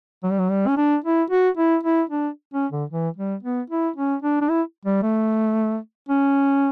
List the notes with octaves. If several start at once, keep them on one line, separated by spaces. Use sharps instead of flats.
F#3
G3
F#3
G3
C#4
D4
E4
F#4
E4
E4
D4
C#4
D3
E3
G3
B3
E4
C#4
D4
D4
E4
G3
A3
C#4